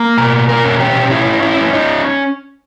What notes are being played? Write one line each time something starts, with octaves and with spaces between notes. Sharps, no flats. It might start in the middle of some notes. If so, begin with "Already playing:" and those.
Already playing: A#3
B2 A#4
A#4
C#4
G4
C#4 E4
E4
C#4
D#4